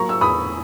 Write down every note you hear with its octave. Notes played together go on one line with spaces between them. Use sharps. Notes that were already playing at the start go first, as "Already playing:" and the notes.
Already playing: F#3 A#3 A#5 C#6
E6
E2 B5 D#6